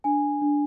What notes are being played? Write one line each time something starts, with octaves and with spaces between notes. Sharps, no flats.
D4 G#5
D4